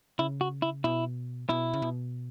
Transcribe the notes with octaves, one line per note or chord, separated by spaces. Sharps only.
C#3 E4
F#4
E4
B2 E4
B2 E4
C#3
B2